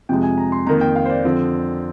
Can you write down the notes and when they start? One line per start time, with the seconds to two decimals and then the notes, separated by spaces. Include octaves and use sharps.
0.09 F2 C3 F3 G#3 G5
0.23 G#5
0.38 A#5
0.52 C6
0.67 F2 D#3 A#3 A#5
0.81 G5
0.95 F5
1.05 C5
1.10 D5
1.24 F2 D3 F3 C4